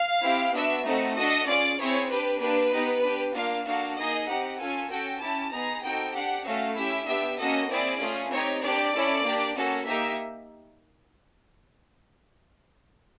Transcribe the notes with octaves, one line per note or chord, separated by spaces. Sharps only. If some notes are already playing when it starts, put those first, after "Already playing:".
Already playing: F5
C4 E4 G4
B3 D4 F#4 E5
A3 C4 D#4 F#4 A4
D4 F#4 A4 D#5
C#4 F4 G#4 D5
C4 E4 G#4 C#5
D4 G4 B4
A#3 D4 G4 B4
B3 D#4 G4
D4 G4
A#3 D4 F4 F5
A#3 D4 F#4 A4 F5
A#3 D#4 G#4 D#5
C4 D#4 G4 F#5
C#4 F4 A4 G#5
C#4 F#4 A4 G5
C#4 E4 G4 A5
B3 D#4 G#4 A#5
C4 D#4 F#4 A4 G5
D4 G4 F#5
A3 C#4 F#4 A4 F5
C#4 E4 G4 E5
B3 D4 G4 E5
A#3 C#4 F#4 A4 D#5
C4 E4 G#4 D5
A3 C#4 F4 G#4
C4 D#4 G4 C#5
D4 G4 D5
C#4 E4 A4
A#3 D4 G4
A#3 C#4 F#4 A4
A#3 D#4 G4 E5